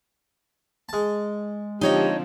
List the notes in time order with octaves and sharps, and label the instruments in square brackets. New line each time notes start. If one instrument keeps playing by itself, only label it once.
[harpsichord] G#3 A5
[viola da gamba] D3 F3 C4 [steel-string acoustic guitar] D#4 C#5 D#5 [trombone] G4